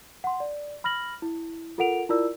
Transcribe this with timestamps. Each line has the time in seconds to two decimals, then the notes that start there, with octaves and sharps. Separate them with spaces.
0.24 F#5 C6
0.40 D5
0.84 B5 F6 A#6 F#7
1.22 E4
1.78 F4 A4 A#4 F#5 D7 F7
2.09 E4 F4 A#4 D5 E6